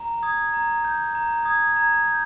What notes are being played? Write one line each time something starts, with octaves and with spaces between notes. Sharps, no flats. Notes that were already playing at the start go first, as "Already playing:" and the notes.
Already playing: A#5
D#6 G#6
A#5
G6
A#5
D#6 G#6
A#5 G#6
G6